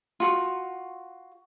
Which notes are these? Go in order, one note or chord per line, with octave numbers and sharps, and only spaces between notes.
F4 F#4 C#6